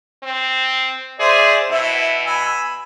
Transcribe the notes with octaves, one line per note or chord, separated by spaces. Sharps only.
C4
G#4 C5 D5 E5
B2 E4 E5
G#5 B5 E6